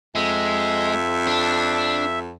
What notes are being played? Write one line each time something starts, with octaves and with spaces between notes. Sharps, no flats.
F2 G#3 E5
D4